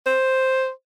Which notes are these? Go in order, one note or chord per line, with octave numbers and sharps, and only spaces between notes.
C5